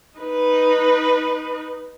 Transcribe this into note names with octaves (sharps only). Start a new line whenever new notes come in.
D#4 B4